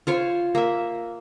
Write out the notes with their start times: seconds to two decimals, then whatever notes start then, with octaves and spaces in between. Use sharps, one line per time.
0.07 F4 C5 C#5
0.55 A#3 E5